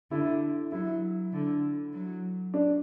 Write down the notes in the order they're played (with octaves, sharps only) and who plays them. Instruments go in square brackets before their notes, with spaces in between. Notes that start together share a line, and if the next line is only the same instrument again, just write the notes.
[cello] D3 [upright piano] E4
[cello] F#3 [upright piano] E4
[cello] D3
F#3
[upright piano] D4